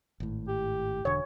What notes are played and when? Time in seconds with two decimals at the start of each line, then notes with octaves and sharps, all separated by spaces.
0.20 G#1 A2
0.48 G4
1.05 E1 D3 C#5